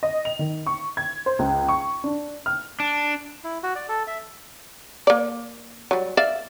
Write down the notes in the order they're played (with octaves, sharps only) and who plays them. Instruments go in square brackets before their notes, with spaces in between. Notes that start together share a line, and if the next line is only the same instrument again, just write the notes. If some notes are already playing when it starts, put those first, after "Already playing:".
[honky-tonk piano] D#5
F7
D#3
C#6
G#6
C5
C#2
C#6
D4
F6
[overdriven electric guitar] D4
[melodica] E4
F#4
D5
A4
E5
[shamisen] A#3 D5
F#3 G3
D5 E5 F5